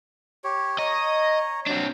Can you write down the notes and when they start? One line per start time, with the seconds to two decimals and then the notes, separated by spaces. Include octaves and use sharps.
0.44 G4 C#5
0.79 C#5 D#5 A#5
1.67 F#3 C4 D4